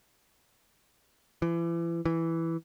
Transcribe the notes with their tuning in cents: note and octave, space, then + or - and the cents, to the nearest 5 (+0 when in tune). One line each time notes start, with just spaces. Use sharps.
E3 +35
E3 +0